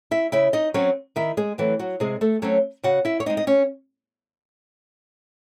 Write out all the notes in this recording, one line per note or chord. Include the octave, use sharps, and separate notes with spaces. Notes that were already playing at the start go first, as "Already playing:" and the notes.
E4 E5
C#3 E4 E5
D#4 D#5
F#3 C4 C#4 C#5
D#3 E4 E5
G#3 G#4
E3 F#3 A3 C4 E4
F#3 F#4
C3 G#3 G#4
A3 A4
F#3 A3 C4 C#4 C#5
C#3 F#4 F#5
E4 E5
C#5
G#3 C4 D#4 D#5
D#5
C#4 C#5